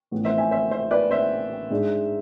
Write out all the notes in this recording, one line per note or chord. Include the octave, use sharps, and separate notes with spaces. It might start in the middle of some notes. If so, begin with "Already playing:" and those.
A1 A2 F3 B3
C5 E5
E5 G#5
C5 E5
C5 E5
B4 D5
C5 E5
G#2 G#3 D4